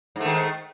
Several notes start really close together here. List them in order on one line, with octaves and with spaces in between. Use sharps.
G#2 A3 D#3